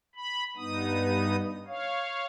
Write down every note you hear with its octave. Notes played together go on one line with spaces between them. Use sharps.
B5
G2 B3 D#4 D#6
C#5 F5